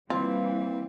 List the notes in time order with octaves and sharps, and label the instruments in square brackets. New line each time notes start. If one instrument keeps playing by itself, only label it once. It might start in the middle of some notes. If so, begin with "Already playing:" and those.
[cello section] E3 G3 [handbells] A#3 [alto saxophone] C4 [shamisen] F4